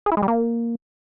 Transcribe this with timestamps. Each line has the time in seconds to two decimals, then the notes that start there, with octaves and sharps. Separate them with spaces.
0.06 G#4
0.12 E4
0.17 G#3
0.23 G3
0.28 A#3